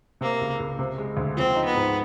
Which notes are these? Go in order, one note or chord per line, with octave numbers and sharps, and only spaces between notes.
C3 A#3
C#2
C#2
C3
G#3
D2
F3 C4
D#4
B3
G#2